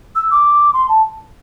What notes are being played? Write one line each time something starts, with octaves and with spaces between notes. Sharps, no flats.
E6
D6
C6
A5